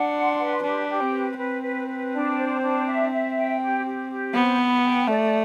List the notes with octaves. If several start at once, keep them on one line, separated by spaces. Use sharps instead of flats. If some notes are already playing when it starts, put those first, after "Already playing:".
Already playing: D4 F#5
C6
B4
D4 G4
G4
C4
B4
C4 B4
B4
B4
D4
C5
D4
E5
E5
G5
G4
G4
G4
B3 C5
B5
G5
A3 D5